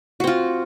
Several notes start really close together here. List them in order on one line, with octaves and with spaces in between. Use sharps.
F#4 C4 F4